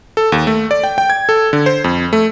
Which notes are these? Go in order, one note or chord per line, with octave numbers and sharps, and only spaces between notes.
A4
D#2
A3
D5
G5
G5
G#6
A4
D3
C5
F2
A3